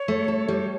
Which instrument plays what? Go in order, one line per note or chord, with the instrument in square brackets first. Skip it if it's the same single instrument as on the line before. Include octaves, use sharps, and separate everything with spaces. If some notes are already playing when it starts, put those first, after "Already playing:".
Already playing: [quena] C#5
[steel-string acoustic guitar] A3
A4
G3